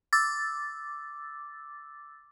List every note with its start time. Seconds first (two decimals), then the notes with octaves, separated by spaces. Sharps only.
0.13 D6 E6 A6